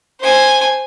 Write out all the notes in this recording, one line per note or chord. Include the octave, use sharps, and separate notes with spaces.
C5 G#5